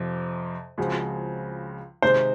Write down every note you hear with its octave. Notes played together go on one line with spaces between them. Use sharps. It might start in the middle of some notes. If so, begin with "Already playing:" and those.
Already playing: F2 C3 F3
C#2 C#3 F3 C4 F#4
C3 D#3 G#3 D#4 C5